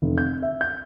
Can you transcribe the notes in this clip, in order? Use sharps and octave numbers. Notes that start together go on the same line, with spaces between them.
F1
G6
E5
G6